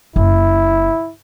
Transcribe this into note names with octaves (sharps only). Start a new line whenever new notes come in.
F#1 E4